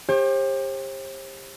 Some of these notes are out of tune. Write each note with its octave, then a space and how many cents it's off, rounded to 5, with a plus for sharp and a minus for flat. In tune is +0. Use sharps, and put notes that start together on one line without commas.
G4 +25 C5 +45